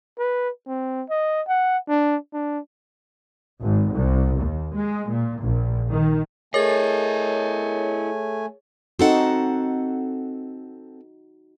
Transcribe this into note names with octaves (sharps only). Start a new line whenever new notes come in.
B4
C4
D#5
F#5
D4
D4
G#1
C2
D#2
G#3
A#2
A#1
D#3
A3 E4 G#4 A#4 C#5 D#5 G#5 A6
C4 D#4 F#4 A4 F#5